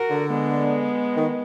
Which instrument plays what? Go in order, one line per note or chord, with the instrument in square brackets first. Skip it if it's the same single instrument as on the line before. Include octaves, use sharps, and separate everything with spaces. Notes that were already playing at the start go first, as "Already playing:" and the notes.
Already playing: [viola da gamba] F#4 A#4
[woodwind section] D3
[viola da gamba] G#3 B3
[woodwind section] D#3